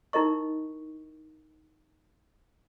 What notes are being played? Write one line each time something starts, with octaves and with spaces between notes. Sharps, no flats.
D#4 E4 A#4 D#5 C#6